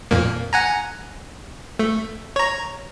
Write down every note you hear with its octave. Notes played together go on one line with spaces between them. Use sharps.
F2 A#2 A#3
F#5 G#5 A#5
A3
C#5 A#5